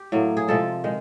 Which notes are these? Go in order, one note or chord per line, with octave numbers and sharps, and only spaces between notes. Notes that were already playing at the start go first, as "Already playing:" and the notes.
Already playing: G4
A2 F#3 A#3
G#4
C3 F3 G#3 A4
D#3 G#3